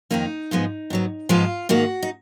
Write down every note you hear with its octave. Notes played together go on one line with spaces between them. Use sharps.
F2 D#3 A#3 D#4
G#2 F3 G#3 B3
G#2 F#3 B3
G#2 F3 G#3 B3 F4
G#2 D#3 A#3 F#4
D#4